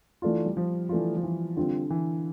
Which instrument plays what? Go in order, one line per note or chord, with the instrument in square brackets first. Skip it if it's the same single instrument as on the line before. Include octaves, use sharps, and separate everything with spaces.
[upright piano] E3 A3 D4 F4
[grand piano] G3
F3
[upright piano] E3 A3 D4 F4
[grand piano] F3
E3
[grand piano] D3 [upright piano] G3 C4 F4
[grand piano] E3